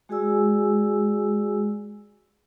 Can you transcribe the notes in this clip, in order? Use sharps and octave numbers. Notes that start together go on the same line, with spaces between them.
G#3 F#4 G#4 D5 G#5 E6